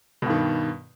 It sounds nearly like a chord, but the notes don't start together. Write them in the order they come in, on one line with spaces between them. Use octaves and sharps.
B2 G2 D#3